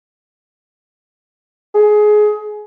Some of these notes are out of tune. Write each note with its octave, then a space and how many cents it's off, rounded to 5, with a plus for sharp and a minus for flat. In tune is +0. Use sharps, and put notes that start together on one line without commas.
G#4 +20